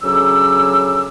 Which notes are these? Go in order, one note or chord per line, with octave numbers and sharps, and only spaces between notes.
D2 C#3 F#3 C#4 D6 E6